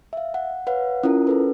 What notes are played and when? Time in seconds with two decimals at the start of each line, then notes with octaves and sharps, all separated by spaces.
0.13 E5 F5
0.34 F#5
0.67 B4 C#5 F5 F#5
1.03 C#4 E4 F4 A#4
1.27 C#4 A4 B4